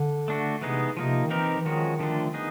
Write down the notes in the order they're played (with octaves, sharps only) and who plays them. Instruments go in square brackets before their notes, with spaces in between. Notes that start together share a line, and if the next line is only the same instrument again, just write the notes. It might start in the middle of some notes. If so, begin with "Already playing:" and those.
Already playing: [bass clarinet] D3
[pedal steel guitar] A3 D4 F#4
[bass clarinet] C3 [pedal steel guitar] E3 G#3 B3 D#4 G#4
[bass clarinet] C3 [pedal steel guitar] F3 A#3 D#4
[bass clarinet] D#3
[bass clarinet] E3 [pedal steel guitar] C4 D#4 G4 A#4
[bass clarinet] E3
[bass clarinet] D#3 [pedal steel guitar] F3 G#3 C#4 F#4
[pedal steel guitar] D3 F3 A3 D4
B3 D#4 G#4